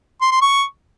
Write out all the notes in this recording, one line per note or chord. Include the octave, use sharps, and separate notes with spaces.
C6
C6
C#6